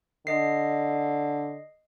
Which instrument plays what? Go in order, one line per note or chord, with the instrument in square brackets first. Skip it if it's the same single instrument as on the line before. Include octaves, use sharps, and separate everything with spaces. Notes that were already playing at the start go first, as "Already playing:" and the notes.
[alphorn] D3 [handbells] D#5 C7